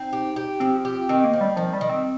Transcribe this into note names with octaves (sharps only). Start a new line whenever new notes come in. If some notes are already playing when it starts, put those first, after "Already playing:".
Already playing: C4 D#4
G4
G4
F3 C4
G4
D#3 C4
A#3
C4
G3
D#3 F3
G3
D#3
C4